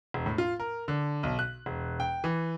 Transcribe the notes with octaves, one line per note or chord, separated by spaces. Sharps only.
E1
A2
F4
A#4
D3
B1
F#6
E1
G5
E3